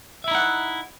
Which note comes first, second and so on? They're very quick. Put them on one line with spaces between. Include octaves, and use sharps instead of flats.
E5 E4 D#4 F#5